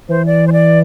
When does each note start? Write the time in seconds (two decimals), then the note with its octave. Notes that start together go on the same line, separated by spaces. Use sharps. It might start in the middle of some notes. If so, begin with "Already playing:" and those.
0.09 E3 C5
0.26 D5
0.47 C5
0.52 D5